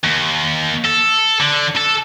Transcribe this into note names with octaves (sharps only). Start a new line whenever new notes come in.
D#2
A4
D3
A4